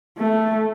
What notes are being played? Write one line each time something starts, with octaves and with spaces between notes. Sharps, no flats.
A3